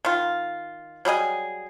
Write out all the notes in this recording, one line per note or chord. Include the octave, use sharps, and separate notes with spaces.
D#3 F4
F#3 G3 G#4 D#5